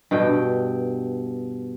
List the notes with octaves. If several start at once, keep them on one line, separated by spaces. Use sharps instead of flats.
G2 B2 G5